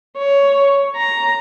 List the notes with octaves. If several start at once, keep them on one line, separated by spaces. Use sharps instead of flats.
C#5
A#5